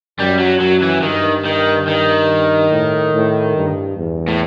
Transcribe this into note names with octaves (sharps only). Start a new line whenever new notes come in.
F#2 G3
F#3
F#2 F#3
E3
G2 D#3
D#3
D#3
A2
A2
G2
E2
A2